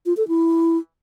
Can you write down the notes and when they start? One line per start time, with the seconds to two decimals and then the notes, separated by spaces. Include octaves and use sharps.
0.06 F4
0.17 A4
0.28 E4